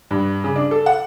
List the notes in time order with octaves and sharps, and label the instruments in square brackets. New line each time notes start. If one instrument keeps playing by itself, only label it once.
[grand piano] G2
C#3
D4
A4
F#5